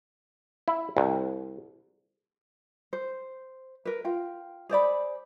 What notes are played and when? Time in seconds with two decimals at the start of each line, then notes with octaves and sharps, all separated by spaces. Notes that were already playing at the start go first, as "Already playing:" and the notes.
0.68 E4
0.97 C2
2.93 C5
3.85 A#4 B4
4.05 F4 G5
4.69 G#4 C5 D5 B5